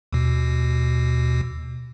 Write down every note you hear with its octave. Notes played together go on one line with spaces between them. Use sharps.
D#2 B2